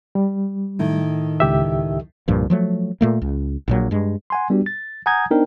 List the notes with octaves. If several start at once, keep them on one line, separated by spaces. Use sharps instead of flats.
G3
A2 D#3
C#2 G4 E5
C2 G2 A#2 F3
F3 F#3 A3
A#2 A3 A#3
C#2
A#1 A#2 F#3
G2 G#3
F#5 G#5 C6
G3 B3 D4 F#4 G4
A6
F#5 G#5 A#5 D#6 G6 G#6
B3 D4 D#4 A#4 C5 G5